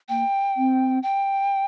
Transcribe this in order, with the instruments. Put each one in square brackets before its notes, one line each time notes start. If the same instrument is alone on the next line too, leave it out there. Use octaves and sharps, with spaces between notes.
[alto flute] A#3 [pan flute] G5
[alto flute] C4
[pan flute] G5